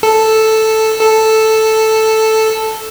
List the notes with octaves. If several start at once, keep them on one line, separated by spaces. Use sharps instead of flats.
A4
A4